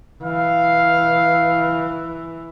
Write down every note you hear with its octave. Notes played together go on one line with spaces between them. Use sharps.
E3 F5